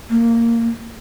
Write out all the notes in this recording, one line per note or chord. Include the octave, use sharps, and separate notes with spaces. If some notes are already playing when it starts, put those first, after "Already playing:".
A#3